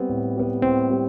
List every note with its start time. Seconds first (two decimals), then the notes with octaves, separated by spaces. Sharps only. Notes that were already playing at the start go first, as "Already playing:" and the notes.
Already playing: G3 B3 C4
0.09 A2
0.36 G3 B3
0.62 A2 C4
0.90 G3 B3